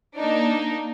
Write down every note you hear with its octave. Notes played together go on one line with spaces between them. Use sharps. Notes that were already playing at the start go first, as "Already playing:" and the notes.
A#3 D4 D#4